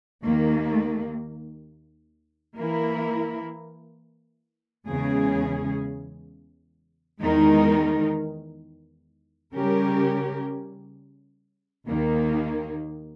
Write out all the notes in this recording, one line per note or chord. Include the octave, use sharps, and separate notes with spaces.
D#2 D#3 A#3
E3 A#3 E4 A#4
E2 C#3 G#3 C#4 G#4
E2 D#3 G#3 D#4 A#4
C#3 G3 C#4 G4 A#4
D#2 D#3 A#3